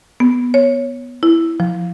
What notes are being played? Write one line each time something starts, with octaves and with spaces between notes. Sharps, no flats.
B3
C#5
E4
F3